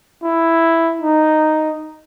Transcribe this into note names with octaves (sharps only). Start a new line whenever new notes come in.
E4
D#4